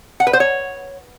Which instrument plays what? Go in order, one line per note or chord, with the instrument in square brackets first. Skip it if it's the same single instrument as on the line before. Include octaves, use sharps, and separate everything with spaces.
[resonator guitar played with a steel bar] F#5
B4
C5
C#5